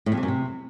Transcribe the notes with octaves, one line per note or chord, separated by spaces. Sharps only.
A2
F2
C3
F#2
C3